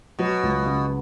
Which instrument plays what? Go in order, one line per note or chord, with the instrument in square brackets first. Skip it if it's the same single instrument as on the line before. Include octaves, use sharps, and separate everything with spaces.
[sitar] B2 [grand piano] F#3
[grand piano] C#2
C#3